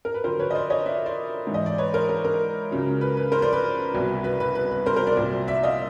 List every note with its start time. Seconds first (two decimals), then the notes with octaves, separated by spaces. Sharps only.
0.05 A#4
0.14 B4
0.24 F2 D3 F#3 A#4 C5
0.40 B4 C#5
0.51 D#5
0.55 C5 D5
0.70 C#5 D#5
0.85 D5 E5
1.06 C5 D5
1.47 G#2 E3
1.54 D#5
1.66 D5
1.78 B4 C#5
1.94 A#4 C5
2.09 A#4
2.25 A#4
2.71 C#2 C#3 F#3
3.01 B4
3.17 B4
3.32 A#4 C5
3.42 C5 D5
3.53 B4
3.93 C2 B2 F#3
4.24 B4
4.40 B4
4.55 B4
4.71 B4
4.86 A#4 C5
4.96 A#4 C5
5.07 C5 D5
5.17 C2 A#2 F#3
5.48 D5 E5
5.63 D#5 F5